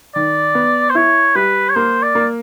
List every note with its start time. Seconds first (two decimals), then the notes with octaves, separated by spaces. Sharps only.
0.15 D#3 D5
0.55 B3
0.90 C5
0.95 E4 C#5
1.35 G3 B4
1.70 C#5
1.75 A#3 C5
2.02 D5
2.15 A#3